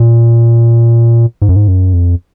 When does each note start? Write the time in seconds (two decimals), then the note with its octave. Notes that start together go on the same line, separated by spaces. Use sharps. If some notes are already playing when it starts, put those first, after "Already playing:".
Already playing: A#2
1.42 G#2
1.49 F#2
1.56 G#2
1.68 F#2
1.93 F2